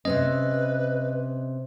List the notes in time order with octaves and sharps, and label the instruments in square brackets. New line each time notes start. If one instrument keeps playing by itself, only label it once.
[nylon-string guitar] C3 C4 C#4 [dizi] B4 [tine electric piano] D#5